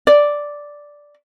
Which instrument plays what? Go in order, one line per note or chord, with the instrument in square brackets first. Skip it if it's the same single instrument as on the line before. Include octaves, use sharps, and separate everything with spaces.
[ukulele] D5